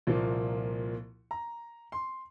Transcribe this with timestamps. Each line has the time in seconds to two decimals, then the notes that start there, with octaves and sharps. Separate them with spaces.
0.07 C2 A#2 F3 A#3
1.31 A#5
1.92 C6